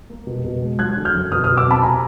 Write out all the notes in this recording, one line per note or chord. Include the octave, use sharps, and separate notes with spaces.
A#3
B2
B2
G#3
F#3 F#6 G#6
D3
F6 G6
F#2
B2 D#6 F6
B2 D#6 F6
D6 E6
C4 A5 B5
C3 G#5 A#5